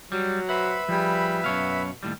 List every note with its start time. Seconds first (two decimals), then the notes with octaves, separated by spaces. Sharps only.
0.12 F#3 G3
0.49 B4 C5 E5 F#5 B5
0.89 F3 G3 G#4
1.44 F#2 B2 C#5 F5
2.03 D#2 A2 G3